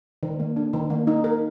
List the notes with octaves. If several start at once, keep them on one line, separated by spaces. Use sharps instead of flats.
D#3
A#3
D4
D#3
A#3
D#4
A#4